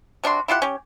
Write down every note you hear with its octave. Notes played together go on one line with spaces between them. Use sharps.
C3 D4 F#4 C6
E4 F4 G4 F#5
C#4 G4